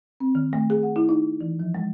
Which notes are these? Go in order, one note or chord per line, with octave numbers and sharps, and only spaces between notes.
C4
D#3
A3
G#4
F#5
E4
D#4
E3
F3
G#3